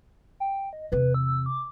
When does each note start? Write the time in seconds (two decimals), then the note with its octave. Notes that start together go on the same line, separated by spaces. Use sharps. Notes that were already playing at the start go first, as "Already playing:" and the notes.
0.40 G5
0.73 D#5
0.92 E2 C3 B4
1.14 E6
1.46 D6